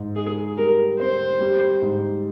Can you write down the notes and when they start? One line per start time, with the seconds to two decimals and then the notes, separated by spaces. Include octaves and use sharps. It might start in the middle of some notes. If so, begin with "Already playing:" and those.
Already playing: G#2
0.16 G#2 G#4
0.57 G3 A#4
0.99 C4 C5
1.41 G3
1.82 G#2